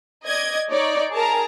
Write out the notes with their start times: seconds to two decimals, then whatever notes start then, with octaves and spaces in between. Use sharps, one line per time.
0.25 D5 D#5 G#6
0.71 D#4 C#5 D5
1.14 G#4 A#4 A5 A#5